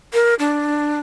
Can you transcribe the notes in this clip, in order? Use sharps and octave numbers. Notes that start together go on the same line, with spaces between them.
A#4
D4